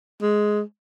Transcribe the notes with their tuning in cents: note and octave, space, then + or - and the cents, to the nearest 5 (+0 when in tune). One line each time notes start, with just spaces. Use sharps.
G#3 +10